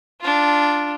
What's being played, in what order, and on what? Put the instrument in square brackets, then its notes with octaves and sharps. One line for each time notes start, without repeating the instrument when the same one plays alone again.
[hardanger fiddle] D4 F4